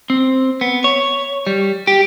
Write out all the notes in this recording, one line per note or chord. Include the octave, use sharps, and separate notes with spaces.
C4
B3
C#5
G3
G4